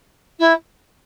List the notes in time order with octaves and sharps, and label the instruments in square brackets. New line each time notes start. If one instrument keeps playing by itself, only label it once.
[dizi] E4